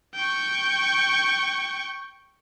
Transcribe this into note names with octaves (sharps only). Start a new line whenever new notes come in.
G5 C#6